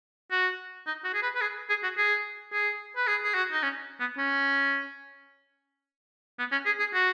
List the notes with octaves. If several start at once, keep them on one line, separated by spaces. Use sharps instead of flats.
F#4
D#4
F#4
G#4
B4
B4
G#4
G#4
F#4
G#4
G#4
B4
G#4
G#4
F#4
D#4
C#4
B3
C#4
B3
C#4
G#4
G#4
F#4